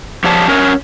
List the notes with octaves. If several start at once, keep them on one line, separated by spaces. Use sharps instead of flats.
F3 G4 C#5 D5 A5
C#4 A#4 C#5